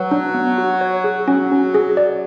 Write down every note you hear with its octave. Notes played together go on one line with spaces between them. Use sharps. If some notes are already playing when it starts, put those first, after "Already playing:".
Already playing: F#3 B4
D4
B3
F#4
C#5
G#4
F#3 C#4
C#4
G#4
D5